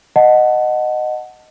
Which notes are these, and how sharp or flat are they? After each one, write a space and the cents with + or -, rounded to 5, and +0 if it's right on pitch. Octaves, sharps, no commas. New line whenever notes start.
D#5 -10 F#5 +0 A5 +0